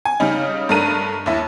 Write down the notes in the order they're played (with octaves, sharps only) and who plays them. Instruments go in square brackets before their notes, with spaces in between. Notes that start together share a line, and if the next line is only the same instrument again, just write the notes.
[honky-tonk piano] G#5
C#3 G3 D#4
G2 A3 D4 A#4 D#7
D#2 E4